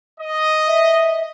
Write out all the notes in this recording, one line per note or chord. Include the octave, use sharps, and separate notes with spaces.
D#5
E5